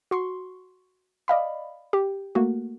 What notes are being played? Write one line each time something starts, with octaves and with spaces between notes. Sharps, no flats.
F#4 C6 C#6
D5 D#5 F5 B5
G4
A3 A#3 F#4